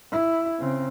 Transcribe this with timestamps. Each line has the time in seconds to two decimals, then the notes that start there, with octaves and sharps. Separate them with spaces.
0.12 E4
0.59 C#3 C4